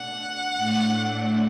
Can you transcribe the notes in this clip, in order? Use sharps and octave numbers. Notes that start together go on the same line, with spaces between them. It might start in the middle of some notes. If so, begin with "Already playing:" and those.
Already playing: B2 A3 D4 F#5
A2 A3 D4